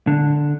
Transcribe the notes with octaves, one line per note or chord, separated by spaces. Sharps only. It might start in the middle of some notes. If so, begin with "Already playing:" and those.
D3